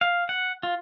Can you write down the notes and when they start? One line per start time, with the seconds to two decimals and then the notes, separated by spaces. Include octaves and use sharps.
0.01 F5
0.29 F#5
0.63 F4